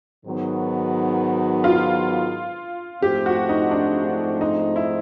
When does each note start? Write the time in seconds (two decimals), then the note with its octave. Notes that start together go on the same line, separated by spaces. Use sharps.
0.25 G#2 D#3 F#3 B3
1.64 F4
3.02 G#2 F3 A3 C4 G4
3.26 F#4
3.49 D#4
3.71 D4
4.41 D#4
4.76 E4